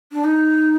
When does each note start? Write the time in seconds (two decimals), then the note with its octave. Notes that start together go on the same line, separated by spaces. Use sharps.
0.12 D4
0.24 D#4